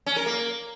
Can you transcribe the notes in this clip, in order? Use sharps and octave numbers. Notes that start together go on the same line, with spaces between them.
C#4
A#4
A#3